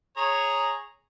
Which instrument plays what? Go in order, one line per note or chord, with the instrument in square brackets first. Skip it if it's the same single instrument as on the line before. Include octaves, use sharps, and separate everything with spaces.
[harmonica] G#4 C#5 A#5